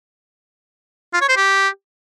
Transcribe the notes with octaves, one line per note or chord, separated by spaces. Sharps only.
F4
C#5
C5
G4